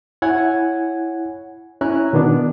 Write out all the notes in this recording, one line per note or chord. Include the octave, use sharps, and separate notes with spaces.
E4 C#5 F#5 G#5 G#6
C#4 E4 G#5 A#5 F#6
B2 D#3 B3 D4